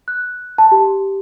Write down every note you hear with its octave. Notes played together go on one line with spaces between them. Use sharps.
F#6
A5
G4